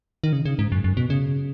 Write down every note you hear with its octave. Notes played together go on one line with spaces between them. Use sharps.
D#3
C#3
C#3
G#2
F#2
F#2
B2
C#3